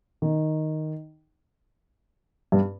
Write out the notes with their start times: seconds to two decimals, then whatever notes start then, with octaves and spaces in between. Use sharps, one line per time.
0.22 D#3
2.52 G2 G3